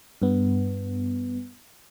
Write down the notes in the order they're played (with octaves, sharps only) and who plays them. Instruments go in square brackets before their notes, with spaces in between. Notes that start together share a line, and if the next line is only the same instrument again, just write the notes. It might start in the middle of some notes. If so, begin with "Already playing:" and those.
[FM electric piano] G2 B3